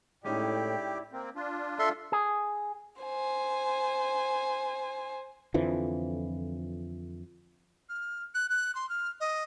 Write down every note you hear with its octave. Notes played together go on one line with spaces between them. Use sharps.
A2 G#3 C#4 D#4 E4 G4 D5 G5
A#3 C4
D4 F4
A4 E5 C6
G#4
C5 G#5
F2 D3 E3 F3
F6
F#6
F#6
C6
F6
D#5